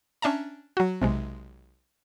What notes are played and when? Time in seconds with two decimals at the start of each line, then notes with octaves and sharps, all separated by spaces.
0.22 C#4 D4 E5 A5 A#5
0.77 F#3 F#4
1.02 B1 C3 G#3